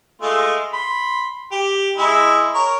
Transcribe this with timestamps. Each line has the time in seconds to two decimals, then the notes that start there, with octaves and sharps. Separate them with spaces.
0.22 G#3 A3 F4
0.73 B5 C6
1.52 G4 D6
1.98 G#3 E4
2.54 A#4 C#5